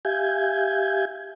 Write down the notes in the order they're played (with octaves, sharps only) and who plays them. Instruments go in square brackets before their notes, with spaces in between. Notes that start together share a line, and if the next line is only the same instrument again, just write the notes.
[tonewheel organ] G4 E5 F5 G#5 G6 G#6